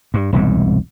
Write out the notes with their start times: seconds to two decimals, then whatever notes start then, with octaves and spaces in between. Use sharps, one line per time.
0.14 G2
0.33 E1 C2 G#2